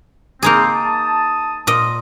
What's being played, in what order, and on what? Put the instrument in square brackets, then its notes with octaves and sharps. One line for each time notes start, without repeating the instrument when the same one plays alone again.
[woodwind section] C#3 C4 [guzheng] A#3 D#4 G#4
[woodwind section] A5 D#6
[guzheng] A#2 D#5